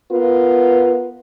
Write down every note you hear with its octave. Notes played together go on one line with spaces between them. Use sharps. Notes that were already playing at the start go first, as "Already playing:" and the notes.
B3 F4 A#4 B4